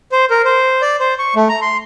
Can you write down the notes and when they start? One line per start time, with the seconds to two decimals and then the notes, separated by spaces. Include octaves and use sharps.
0.12 C5
0.30 A#4
0.45 C5
0.82 D5
0.99 C5
1.19 C#6
1.36 A3
1.49 A#5
1.62 C6